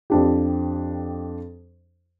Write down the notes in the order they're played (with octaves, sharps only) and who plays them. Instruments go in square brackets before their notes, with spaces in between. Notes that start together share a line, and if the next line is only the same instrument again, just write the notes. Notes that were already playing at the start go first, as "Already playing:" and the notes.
[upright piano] F2 D4 G4